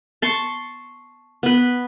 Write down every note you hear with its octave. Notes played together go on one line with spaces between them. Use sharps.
A5 C6 C#6
B3 B4